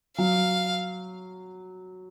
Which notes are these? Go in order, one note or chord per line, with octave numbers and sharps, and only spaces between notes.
F#3 F5